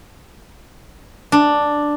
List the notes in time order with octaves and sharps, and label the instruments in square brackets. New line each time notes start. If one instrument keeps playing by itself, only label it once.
[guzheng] D4